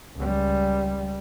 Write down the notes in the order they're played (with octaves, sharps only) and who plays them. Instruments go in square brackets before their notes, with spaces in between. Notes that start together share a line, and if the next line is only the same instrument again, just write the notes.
[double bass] C#2 G3